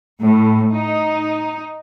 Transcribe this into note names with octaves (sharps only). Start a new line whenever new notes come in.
A2
D#4